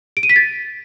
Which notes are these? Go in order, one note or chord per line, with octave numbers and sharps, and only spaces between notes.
D7
D#7
B6
A6